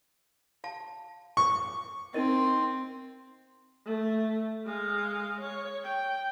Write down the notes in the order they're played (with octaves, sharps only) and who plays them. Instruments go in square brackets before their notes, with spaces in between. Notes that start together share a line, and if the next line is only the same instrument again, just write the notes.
[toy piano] F5 A5
[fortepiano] C#6 [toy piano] D6
[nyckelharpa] C4 [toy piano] D#4 A#4 D#5
[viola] A3
G#3 F5
C#5
G5